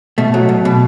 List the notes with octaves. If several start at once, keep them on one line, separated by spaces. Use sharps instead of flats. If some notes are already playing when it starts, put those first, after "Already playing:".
B2 A3
F#3
B2
B2